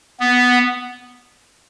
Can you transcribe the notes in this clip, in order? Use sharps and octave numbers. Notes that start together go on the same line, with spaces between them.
B3